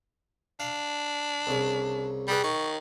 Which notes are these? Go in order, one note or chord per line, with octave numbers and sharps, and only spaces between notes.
D4 F5
C2 C#3
G3 G4 G#4 B4
D#3 C#6